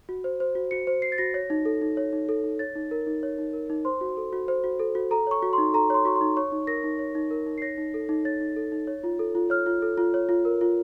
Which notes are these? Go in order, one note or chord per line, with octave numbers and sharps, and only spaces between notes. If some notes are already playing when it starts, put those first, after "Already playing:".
F#4
C5
C5
F#4
F#4 C#7
C5
C5 C7
A6
F#4 A#6
C#5
D#4
A4
D#4
C#5
D#4
A4
D#4
C#5 A6
D#4
A#4
D#4
C#5
D#4
A#4
D#4
C5 C6
F#4
A4
F#4
C5
F#4
A4
F#4
A4 A#5
C#5 C#6
F#4
C6
D#4
A4 A#5
C#5 C6
F#4 C#6
C6
D#4
C#5 C#6
D#4
A#4 A#6
D#4
C#5
D#4
A#4
D#4
C7
C#5 A#6
D#4
A4
D#4
C#5 A6
D#4
A4
D#4
C#5
F4
A4
F4
C#5 F6
F4
A4
F4
C#5
F4
A#4
F4